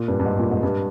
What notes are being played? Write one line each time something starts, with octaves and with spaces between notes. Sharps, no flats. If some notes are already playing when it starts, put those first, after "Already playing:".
Already playing: A#2
G2
G2
G#2
A#2
G#2
G2